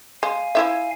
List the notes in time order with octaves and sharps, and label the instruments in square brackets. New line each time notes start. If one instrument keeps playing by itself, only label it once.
[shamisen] G#3 [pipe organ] F5 G#5
[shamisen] F3 E4 E5